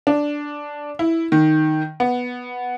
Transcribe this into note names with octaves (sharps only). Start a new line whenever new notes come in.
D4
E4
D#3
B3